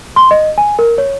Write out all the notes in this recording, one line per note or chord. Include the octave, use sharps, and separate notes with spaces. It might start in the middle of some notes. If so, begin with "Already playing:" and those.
C6
D#5
G#5
A#4
C#5